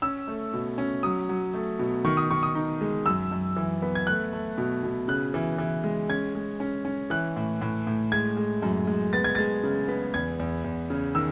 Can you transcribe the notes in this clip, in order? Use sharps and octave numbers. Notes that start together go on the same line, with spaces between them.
C#4 E6
A3
B2
C#4
F#3 D#6
F#3
A3
B2
D#3 C#6
D#6
D#3 C#6
D#6
D#4
G#3
F#2 E6
F#2
E3
B3
G#6
A3 F#6
A3
B2
B2
C#3 F#6
E3
E3
G#3
C#4 G#6
G#3
C#4
C#4
E3 F#6
A2
A2
A2
G#3 G#6
G#3
F#2
G#3
B3 A6
G#6
G#3 A6
C#3
B3
E2 G#6
E2
E2
C#3
D#3 E6